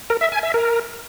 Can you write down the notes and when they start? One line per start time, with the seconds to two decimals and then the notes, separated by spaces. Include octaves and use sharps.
0.10 A#4
0.21 E5
0.32 G#5
0.43 E5
0.54 A#4